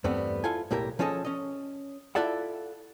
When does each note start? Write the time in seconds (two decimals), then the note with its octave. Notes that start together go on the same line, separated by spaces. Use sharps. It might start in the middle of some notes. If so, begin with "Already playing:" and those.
0.04 E2 G2 G3 A3 B3 C4
0.44 E4 F4 A4 G#5
0.71 B1 A2 A#3 G4 A#4
0.99 F3 C#4 G#4 A4 D5 D#5
1.25 C#4 D#5
2.15 E4 F4 A4 D5 E5 F#5